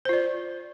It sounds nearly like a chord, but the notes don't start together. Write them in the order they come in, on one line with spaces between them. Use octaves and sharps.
C5 F4 D5